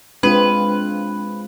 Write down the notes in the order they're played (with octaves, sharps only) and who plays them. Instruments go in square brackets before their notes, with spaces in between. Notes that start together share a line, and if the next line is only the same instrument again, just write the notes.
[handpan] G#3 C4 F4 [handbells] D4 [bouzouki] B4